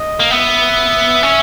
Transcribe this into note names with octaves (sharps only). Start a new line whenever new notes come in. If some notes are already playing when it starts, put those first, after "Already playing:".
Already playing: D#5
A#3
B3 E5
C#4